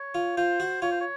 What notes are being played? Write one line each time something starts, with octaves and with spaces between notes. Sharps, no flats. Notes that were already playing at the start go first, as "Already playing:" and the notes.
Already playing: C#5
F4
F4 C5
F#4
F4 C#5
C5
C#5